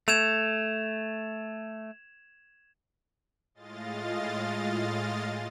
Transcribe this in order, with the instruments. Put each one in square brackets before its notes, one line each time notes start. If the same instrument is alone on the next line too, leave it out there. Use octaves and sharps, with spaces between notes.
[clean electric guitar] A3 [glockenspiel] G#6 E7 F7
[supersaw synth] A2 G#3 F4 D#5 F5 A6